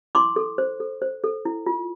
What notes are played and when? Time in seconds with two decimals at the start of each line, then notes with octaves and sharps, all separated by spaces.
0.15 E4 C6 D6
0.36 A4
0.58 C5
0.80 A4
1.02 C5
1.24 A4
1.45 E4
1.66 F4